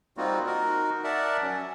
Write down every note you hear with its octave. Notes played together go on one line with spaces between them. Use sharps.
G3 A#3 C4 D#4 F4 F#4
D#4 F#4 A#4
A#4 D5 E5 F#5 A5
F#3 C#4